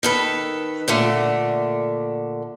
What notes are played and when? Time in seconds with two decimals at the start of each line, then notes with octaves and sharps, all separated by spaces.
0.03 D#3 A4 B4
0.88 A#2 D3 A3